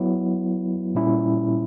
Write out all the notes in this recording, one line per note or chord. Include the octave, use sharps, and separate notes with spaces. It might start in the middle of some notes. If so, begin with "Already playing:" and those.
Already playing: F#3 B3 E4
A#2 G3 C#4 E4